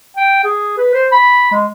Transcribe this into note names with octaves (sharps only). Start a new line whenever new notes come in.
G5
G#4
B4
C5
B5
G#3